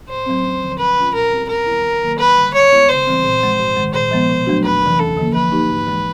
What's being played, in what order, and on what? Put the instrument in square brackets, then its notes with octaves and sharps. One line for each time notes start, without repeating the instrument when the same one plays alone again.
[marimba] A2 [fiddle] C5
[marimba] F#3 A3 C4
D#2
D3 F3
[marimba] B2 [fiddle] B4
[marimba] G#3 C#4 F4
[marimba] A#2 [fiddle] A#4
[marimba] G3 C4 E4 G4
[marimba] D#2 [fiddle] A#4
[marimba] D#3 G3 B3 E4
F2
C3 D#3 F#3 A#3
[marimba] F2 [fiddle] B4
[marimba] D3 G3
[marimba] B2 [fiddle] C#5
[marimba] G#3 B3 E4
[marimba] C#3 [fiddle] C5
[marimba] E3 G3 C4
A#2
F3 G#3
G#2
D#3 G#3
[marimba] A#2 [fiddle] C5
[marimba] F3 G#3 B3
B2
F#3 A3 D4 F#4
[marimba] F2 [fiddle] B4
[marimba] C3 E3
[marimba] D#2 [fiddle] A4
[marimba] D3 F3 A#3
[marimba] F3 [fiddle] B4
[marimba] A#3 D#4 G4
G#2
E3 G#3